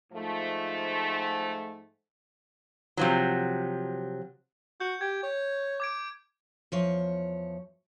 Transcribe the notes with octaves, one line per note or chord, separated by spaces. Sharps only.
G#2 F3 A3
C3 F3 F#3
F#4 G6
G4 G#6
C#5
D6 G#6 D7
E2 F3 C#5